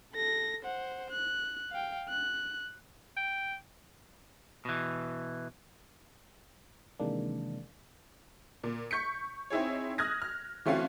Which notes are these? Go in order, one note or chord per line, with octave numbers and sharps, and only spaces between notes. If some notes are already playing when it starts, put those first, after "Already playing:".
A4 A#6
C5 F#5
F#6
F5 G5
F#6
G5
B2 E3
C3 D#3 E3 G#3 A#3 D4
A#2
C#6 G6 B6 C#7
C4 D#4 E4 G#4 C#5
D#6 F6 F#6 G#6 A#6
F6
E3 A3 C4 C#4 F4 F#4